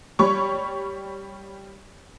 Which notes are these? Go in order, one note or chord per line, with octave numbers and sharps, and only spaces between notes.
G3 C#5 C#6